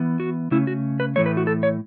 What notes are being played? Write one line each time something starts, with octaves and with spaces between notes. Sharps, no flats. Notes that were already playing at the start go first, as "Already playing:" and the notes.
Already playing: E3 B3
F#4
C#3 A3 C#4 E4
F#4
B4
A2 E3 A3 C#5
B4
F#4
A4
C#5